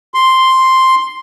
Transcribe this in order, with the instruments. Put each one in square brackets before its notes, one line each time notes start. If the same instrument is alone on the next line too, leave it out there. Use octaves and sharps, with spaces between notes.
[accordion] C6